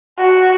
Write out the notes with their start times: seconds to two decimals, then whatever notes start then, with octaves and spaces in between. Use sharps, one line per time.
0.19 F#4